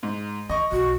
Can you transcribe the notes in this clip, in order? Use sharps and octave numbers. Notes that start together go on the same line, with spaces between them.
G#2
D#3 D#5 C#6
B1 F#4